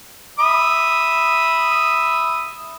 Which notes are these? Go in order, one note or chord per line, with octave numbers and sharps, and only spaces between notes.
E5 B5 D#6